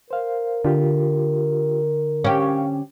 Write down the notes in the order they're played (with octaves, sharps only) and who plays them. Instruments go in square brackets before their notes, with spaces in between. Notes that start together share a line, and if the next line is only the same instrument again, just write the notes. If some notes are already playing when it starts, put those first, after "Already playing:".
[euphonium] A#4 [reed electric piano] C5 F5
[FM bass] D3 [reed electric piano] F4 G4
[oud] C#4 G4 [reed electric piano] F5 C#6